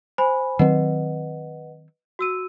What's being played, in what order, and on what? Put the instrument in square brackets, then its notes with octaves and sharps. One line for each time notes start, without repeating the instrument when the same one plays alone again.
[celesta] C5 G#5 B5
[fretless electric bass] D#3 F#3 C4 [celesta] B4 D#5 F#5
[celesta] F#4 E6 D#7